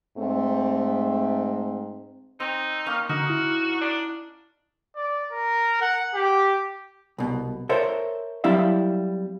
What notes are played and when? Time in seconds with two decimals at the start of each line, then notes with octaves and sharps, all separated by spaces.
0.17 G#2 A3 C4
2.40 C4 D#4
2.86 A#3 C#4 F5
3.09 D3 D#4 F#4
3.30 E4
3.81 D4
4.95 D5
5.32 A#4
5.81 F#5
6.14 G4
7.18 C2 B2
7.69 A4 A#4 C5 C#5 E5
8.44 F#3 G3 C4 E4 E5 F5